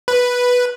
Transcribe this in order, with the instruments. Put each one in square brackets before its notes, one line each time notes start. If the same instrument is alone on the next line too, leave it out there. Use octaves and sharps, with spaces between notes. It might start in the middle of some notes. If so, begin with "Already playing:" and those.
[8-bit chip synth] B4